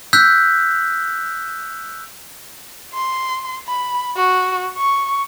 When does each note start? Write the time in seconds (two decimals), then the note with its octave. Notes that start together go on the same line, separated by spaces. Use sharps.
0.13 E6 F#6 G6 B6
2.93 C6
3.67 B5
4.16 F#4
4.77 C#6